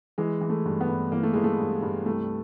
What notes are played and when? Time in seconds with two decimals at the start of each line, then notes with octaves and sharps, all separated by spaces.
0.18 E3 G#3
0.41 E3
0.50 A3
0.66 G2
0.81 B3
0.89 G2
1.12 E3 A#3
1.23 A3
1.34 E3 G#3
1.44 A3
1.59 G2
1.82 G2
2.06 C2 A3